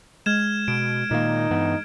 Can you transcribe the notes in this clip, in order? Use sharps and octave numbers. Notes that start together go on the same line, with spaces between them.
G#3 F6 G#6 E7
B2 D7
A#2 D#3 A#3 D#4
G2 E3 B3